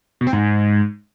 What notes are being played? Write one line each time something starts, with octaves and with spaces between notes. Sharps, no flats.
B2
C4
G#2